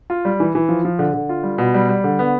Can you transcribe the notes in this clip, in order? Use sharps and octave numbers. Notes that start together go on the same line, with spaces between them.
F4
G3
E3
E3
F3
F3
D3
D3
F4
G3
B2
G3
G3
D3
B3